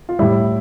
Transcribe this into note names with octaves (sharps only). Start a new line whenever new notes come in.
F4
A2 G3 E4